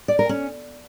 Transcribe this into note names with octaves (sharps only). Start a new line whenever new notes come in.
D5
A#4
C#4